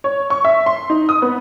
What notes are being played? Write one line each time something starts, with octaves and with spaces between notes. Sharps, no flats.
C#5
C#6
E5
C6
D#4
D#6
B3